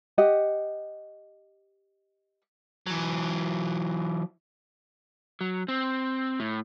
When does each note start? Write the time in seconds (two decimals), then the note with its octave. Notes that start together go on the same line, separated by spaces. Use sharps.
0.18 G4 D#5 F#5
2.87 E3 F#3
5.41 F#3
5.68 C4
6.40 A2